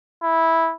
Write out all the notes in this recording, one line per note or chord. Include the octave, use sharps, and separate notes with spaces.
E4